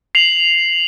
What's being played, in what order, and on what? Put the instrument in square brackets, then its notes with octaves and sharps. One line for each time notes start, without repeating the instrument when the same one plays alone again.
[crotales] C7 F7 F#7